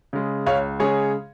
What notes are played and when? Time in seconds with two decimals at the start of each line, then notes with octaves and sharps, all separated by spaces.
0.13 C#3 G#3
0.46 C#2 C#5 F5
0.80 C#3 G#3 G#4 C#5